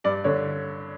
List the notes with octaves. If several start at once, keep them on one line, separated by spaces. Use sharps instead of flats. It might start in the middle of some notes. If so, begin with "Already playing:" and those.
G2 D5
D3 C#5